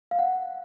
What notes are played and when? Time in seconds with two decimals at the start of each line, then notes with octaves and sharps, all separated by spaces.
0.11 F5
0.19 F#5